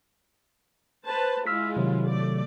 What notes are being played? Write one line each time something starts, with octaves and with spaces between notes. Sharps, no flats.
B4 C5 A5
G#3 E4 F4 E6 F6 B6
C3 D#3 F#3
A3 D5